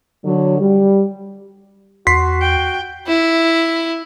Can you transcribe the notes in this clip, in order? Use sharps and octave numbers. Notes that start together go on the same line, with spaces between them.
D3 F#3
G3
E2 F#4 C6 B6 C7
G5
E4